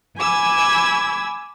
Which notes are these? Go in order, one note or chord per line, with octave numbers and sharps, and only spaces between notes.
G#5 B5 D6 E6 G#6